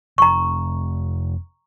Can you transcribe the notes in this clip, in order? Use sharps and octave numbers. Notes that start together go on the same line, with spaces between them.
F1 A#5 C#6